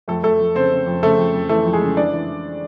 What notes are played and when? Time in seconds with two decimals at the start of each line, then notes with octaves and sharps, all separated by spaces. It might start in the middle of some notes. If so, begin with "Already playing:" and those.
0.08 F2 A3 A4
0.23 F2 A3 A4
0.40 F2
0.55 C#3 C4 C5
0.72 C#3
0.87 F2
1.03 C#3 A3 A4
1.18 F2
1.34 F2
1.49 E3 A3 A4
1.65 F2
1.73 G#3 G#4
1.81 C#3
1.96 E3 D4 D5
2.13 E3
2.28 E3